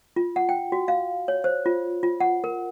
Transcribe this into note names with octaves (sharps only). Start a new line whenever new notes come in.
F4
F#5
G5
F#4
F5
C#5
C5
F4
F4
F#5
A#4